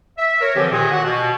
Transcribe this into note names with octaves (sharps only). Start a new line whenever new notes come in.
E5
A#4 C#5
D3 E3 F3 C4 G4
A#2 D#3 G#4
A#3 F#4 F#5
B2